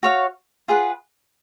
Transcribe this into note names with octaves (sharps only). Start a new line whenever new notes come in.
F#4 C#5 F5
F4 G#4 B4 F#5